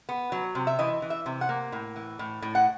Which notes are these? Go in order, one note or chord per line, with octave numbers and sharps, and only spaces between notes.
B3
F#3
C3
E5
E3 D#5
E3
E5
C3
F#5
A#3
A2
E3
A2
A2
F#5